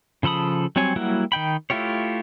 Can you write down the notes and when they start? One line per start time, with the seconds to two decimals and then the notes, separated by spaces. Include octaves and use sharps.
0.23 C#3 F3 A4 B5 D#6
0.76 F#3 G3 C4 C#5 G#5
0.96 F#3 G3 A#3 E4 F#4
1.32 D#3 D#4 G5 B5
1.70 A3 E4 F4 G4 C#5